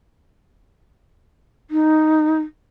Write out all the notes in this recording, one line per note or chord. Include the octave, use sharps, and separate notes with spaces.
D#4